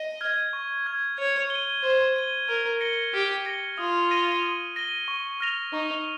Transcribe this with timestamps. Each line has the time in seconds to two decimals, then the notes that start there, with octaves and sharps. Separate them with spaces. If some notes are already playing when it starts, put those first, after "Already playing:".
Already playing: D#5
0.21 F6 G#6
0.53 C#6
0.86 F6 G#6
1.18 C#5 G#6
1.50 G7
1.55 D#7
1.83 C5 G#6
2.16 D#7 G7
2.48 A#4 F6
2.81 A#6 C#7 G7
3.14 G4 F6
3.45 A#6 C#7 G7
3.78 F4 D#6
4.11 A#6 D#7 G7
4.43 D#6
4.76 A#6 D#7 G7
5.08 C#6
5.40 F6 A#6 F7
5.73 D#4 C#6